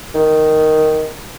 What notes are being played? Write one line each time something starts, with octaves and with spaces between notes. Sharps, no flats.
D#3